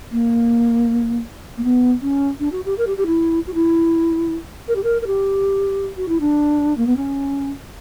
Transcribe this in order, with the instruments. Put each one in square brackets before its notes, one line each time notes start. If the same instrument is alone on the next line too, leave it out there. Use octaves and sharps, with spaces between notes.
[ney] A#3
A#3
B3
C#4
D4
F#4
G4
A#4
G4
G4
E4
F#4
E4
A#4
G4
A#4
A#4
G4
F#4
E4
D4
A#3
B3
C#4